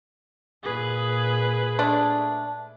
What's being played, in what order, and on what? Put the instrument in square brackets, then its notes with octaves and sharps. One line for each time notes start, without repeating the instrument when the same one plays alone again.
[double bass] A#2 [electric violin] G#4 B4
[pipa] A3 D4